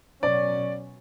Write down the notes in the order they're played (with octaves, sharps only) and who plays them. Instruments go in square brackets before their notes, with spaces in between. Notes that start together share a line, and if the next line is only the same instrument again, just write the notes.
[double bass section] B2 F#3 C#4 [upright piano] D5